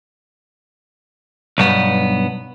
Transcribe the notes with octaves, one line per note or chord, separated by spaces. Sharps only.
B1 G2 B3